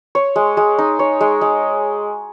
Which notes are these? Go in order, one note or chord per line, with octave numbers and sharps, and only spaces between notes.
C#5
G#3
G#3
D#4
C#5
G#3
G#3